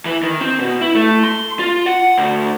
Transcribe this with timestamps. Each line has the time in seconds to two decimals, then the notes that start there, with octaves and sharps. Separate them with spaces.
0.06 E3
0.23 D#3
0.40 C4
0.59 B2
0.81 E4
0.95 A3
1.24 C6
1.59 F4
1.86 F#5
2.18 D2